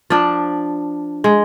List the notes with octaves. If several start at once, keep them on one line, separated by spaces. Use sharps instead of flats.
F3 D4
G#3